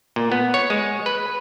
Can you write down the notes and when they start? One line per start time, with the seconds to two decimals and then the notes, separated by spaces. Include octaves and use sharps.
0.16 A#2
0.32 B3
0.54 C#5
0.70 G#3
1.06 B4